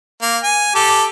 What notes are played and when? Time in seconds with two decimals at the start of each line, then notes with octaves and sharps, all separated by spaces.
0.22 A#3
0.43 G#5
0.75 G4 A4